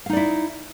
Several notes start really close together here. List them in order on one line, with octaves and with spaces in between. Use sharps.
F5 D#4 D5 E4